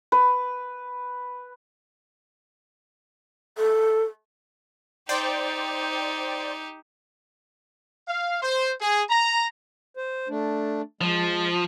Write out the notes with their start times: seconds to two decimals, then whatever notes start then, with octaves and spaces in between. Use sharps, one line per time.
0.12 B4
3.58 A4
5.09 D#4 G4 C5 D5 G5
8.07 F5
8.41 C5
8.80 G#4
9.09 A#5
9.97 C5
10.29 A3 D4
11.01 F3 G#3